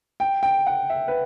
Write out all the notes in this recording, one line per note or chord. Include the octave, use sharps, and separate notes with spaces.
G5
G5
F#5
E5
B4